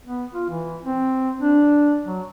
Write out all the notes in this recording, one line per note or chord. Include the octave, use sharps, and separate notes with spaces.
B3
F4
E3
C4
D4
F#3